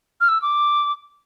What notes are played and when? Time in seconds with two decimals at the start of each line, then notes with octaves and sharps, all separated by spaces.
0.21 F6
0.28 E6
0.42 D6